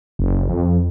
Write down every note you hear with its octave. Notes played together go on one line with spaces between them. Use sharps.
F#1
F2